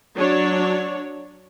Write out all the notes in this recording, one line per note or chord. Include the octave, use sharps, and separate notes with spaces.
F#3 D4 C#5